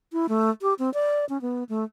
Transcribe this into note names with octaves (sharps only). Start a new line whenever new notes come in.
E4
A3
G4
C4
D5
C#4
B3
A3